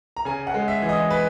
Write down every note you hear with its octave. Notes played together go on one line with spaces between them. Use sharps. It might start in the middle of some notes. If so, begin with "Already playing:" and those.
A#5
C#3 G#5
F#5
G#3
E5
E3
D#5
B4